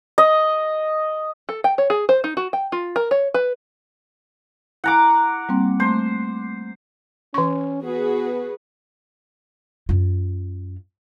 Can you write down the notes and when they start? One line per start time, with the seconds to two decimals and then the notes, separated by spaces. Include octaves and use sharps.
0.18 D#5
1.49 A4
1.64 G5
1.78 C#5
1.90 G#4
2.09 C5
2.24 D#4
2.37 F#4
2.53 G5
2.72 F4
2.96 A#4
3.11 C#5
3.34 B4
4.84 E4 F#5 G#5 A#5 D6
5.49 G3 A#3 C4
5.80 A3 C5
7.34 E3 C#4 C#6
7.83 B3 F#4 G#4 B4
9.89 F#2 F4